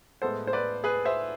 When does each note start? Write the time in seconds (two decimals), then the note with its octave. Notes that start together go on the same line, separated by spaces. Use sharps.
0.22 A2 G#3 B3 A4 C5
0.47 C5
0.53 B4 D5
0.84 G#4 B4
1.05 C5 E5